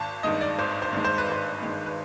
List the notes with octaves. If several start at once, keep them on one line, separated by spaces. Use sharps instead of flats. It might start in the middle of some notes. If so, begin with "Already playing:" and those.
Already playing: G#1 A5
G2 D#3 G#3 D#5
D5
G#1 C5
C5
G2 D#3 G#3
C5
B4
G#1 C5
G2 D#3 G#3
B4